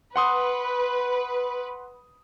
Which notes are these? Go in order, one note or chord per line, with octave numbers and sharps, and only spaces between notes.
B4 F#5 C6 D#6